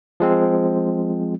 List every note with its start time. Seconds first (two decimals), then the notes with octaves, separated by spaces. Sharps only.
0.20 F3 G#3 C4